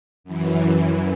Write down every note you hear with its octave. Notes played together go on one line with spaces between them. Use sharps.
F#2 E3